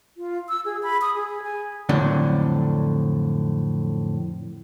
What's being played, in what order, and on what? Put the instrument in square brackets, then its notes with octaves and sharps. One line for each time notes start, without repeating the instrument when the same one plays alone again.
[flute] F4
E6
G#4
B5
D#6
G#4
G#5
[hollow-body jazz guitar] F2 A2 D3 F#3 D4